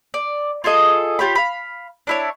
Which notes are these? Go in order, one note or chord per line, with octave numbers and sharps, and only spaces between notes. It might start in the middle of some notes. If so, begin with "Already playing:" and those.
D5
F4 G#4 A4 D#5
F4 G4 C#5 B5
F5 B5
D4 E4 C#5